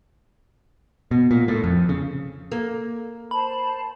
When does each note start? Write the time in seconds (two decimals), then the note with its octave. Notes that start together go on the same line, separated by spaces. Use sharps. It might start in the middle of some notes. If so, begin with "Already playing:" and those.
1.11 B2
1.31 A#2
1.48 A2
1.64 F2
1.89 C#3
2.52 A#3
3.31 C5 A5 B5